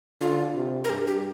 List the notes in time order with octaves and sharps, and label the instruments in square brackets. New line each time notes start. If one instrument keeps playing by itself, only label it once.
[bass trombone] D3 [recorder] F4
[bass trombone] C3
[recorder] A#4
[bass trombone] G2 [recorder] G4
[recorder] G4